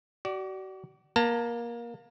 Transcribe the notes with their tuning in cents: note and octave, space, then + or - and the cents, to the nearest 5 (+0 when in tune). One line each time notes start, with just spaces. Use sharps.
F#4 +40 D5 +0
A#3 +20 A5 +45